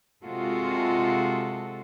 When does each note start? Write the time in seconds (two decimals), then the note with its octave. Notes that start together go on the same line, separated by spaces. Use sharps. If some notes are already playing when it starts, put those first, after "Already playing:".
0.24 C3 G#3 F4 F#4 A4